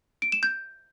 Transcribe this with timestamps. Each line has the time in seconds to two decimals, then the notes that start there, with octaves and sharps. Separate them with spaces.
0.22 D7
0.32 E7
0.43 G6